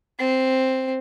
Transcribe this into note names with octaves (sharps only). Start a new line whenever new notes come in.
C4